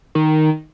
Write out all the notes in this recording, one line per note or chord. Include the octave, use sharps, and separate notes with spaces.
D#3